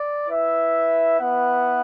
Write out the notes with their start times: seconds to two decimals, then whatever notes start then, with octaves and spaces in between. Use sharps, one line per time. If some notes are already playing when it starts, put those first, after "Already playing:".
Already playing: D5
0.26 E4 B4 E5
1.19 B3 E4 B4 F#5